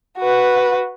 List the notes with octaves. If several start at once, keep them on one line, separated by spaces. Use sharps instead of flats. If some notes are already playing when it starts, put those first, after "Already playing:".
F#4 B4